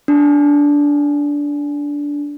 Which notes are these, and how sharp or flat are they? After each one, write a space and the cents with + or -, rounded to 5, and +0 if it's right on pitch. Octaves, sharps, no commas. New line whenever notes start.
D4 -15